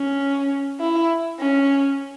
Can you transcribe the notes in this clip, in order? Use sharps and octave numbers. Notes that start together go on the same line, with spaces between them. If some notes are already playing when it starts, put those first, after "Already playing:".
Already playing: C#4
E4
C#4